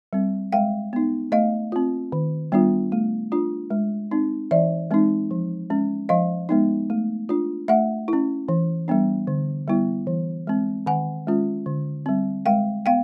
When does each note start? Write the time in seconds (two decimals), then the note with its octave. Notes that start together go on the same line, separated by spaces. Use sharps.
0.13 G3 C4
0.52 G#3 F5 G5
0.93 B3 D#4
1.32 A3 D#5 F5
1.72 C4 F4
2.12 D#3
2.52 G3 B3 D4 F4
2.92 A3
3.32 D4 F4
3.70 G#3
4.11 C4 D#4
4.51 E3 D5 E5
4.91 G#3 C4 D#4
5.31 F3
5.70 G#3 C#4
6.09 F3 D#5 F5
6.49 G#3 B3 D#4
6.90 A3
7.29 D4 F4
7.68 A3 E5 F#5
8.08 C#4 E4
8.48 E3
8.88 G3 B3 D4
9.27 D3
9.68 G3 B3 E4
10.07 E3
10.47 G#3 C4
10.86 D#3 F#5 G#5
11.27 G#3 C#4 F4
11.66 D3
12.06 G3 C4
12.46 G#3 F5 G5
12.86 B3 F5 G5